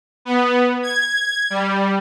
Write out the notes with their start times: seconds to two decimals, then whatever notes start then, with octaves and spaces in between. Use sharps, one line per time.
0.25 B3
0.83 G#6
1.50 G3